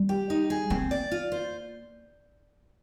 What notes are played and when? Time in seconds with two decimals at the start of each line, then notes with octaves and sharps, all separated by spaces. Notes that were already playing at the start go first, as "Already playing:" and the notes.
Already playing: G3
0.09 G4
0.30 D#4
0.50 G#4
0.70 A#3 C4
0.91 D5
1.11 F4
1.32 C5